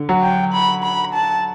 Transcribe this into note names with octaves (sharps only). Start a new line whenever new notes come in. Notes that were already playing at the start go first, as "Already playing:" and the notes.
Already playing: D3
F#3
G5
B5
B5
A5